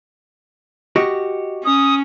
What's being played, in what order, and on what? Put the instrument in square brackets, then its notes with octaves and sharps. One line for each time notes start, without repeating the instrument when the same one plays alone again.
[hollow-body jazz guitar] F#4 G4 D#5
[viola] C#4 [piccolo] D#6